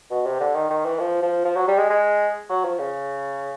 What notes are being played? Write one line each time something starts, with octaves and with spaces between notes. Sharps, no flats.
B2
C3
D3
D#3
D#3
E3
F3
F3
F3
F#3
G3
G#3
G#3
F#3
F3
C#3